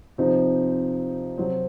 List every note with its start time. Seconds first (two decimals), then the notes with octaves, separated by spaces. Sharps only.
0.18 C3 F3 C4 D#4
1.38 C3 F#3 C4